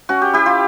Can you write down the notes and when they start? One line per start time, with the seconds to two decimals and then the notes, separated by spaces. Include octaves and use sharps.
0.09 C#4 F#4
0.22 G4
0.34 E4 G4
0.46 F4